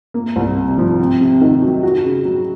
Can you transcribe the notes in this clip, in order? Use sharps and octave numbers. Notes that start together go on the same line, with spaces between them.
A#3
C2
C3
F3
C4
C3
D#3
F#3
F#4
C#3
F#3